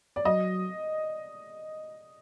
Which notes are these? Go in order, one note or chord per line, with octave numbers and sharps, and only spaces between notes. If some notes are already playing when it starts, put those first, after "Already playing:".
D5
F#3 D#5